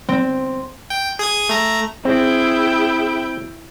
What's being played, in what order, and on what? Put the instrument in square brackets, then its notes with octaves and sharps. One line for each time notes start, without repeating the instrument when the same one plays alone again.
[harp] C4
[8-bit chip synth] G5
G#4 D#6 G#6
A3 A#5
[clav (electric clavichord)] C4 [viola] E4 G5 [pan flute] G#4